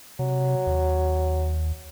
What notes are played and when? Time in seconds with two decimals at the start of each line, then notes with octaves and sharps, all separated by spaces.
0.19 C3 F#3
0.67 D#2